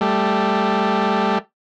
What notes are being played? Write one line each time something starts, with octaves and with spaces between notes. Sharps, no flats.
G3 A3